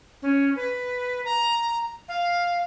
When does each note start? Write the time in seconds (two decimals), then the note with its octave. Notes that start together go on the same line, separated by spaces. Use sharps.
0.22 C#4
0.56 B4
1.25 A#5
2.08 F5